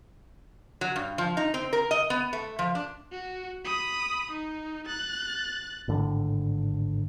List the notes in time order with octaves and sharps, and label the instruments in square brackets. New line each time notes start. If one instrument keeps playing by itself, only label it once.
[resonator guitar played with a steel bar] F#3
G2
F3
D#4
C4
A#4
D#5
B3
A3
F3
D4
[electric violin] F#4
B5 D#6
D#4
F#6 A6
[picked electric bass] G#1 A2 D3